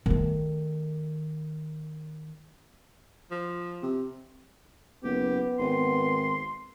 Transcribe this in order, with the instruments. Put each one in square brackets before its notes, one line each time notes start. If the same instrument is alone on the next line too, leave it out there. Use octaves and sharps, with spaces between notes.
[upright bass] D#3 A3
[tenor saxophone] F3
[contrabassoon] C3
[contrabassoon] F#1 [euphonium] B3 [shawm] G4
[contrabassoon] G#1 [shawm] C6